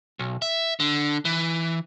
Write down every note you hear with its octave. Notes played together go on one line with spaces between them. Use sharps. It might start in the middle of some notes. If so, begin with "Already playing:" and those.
B1
E5
D3
E3